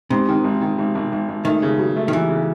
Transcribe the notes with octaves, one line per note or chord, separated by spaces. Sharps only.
G#2 C3
D#3
G#1
D#3
G#1
G#1
G#1
G#1
D#3 A3
C#3
F#3
A3
D#3
D#2 E3
C#3